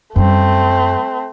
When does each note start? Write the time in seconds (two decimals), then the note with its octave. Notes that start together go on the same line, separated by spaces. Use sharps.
0.16 F#2 G3 A3 C4